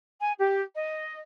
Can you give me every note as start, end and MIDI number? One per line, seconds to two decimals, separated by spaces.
0.21 0.32 80
0.39 0.61 67
0.74 1.19 75